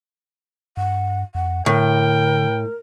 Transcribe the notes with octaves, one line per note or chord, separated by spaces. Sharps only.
G2 F#5
F2 F#5
A2 D3 A#4 G5